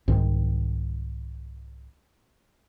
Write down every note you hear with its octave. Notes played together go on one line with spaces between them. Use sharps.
C2 G#2 D#3 C4